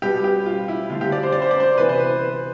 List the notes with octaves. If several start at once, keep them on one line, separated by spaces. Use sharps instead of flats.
B2 G3 B3 G4
G4
F4
E4
D3 A3 F4
G4
D5
C5
D5
C5
D5
C5
C3 E3 B3 B4
C5
B4
B4